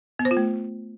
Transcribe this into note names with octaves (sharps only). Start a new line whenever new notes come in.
B3
C5
F4
A3